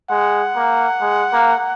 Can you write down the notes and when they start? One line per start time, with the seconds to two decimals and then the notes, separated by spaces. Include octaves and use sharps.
0.10 G#3 F#5
0.56 A#3
1.01 G#3
1.32 A#3